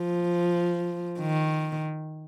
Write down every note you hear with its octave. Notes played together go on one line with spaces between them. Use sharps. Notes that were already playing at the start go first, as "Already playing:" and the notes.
Already playing: F3
D#3